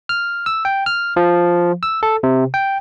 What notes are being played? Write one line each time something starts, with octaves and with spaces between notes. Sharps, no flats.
F6
E6
G5
F6
F3
E6
A4
C3
G5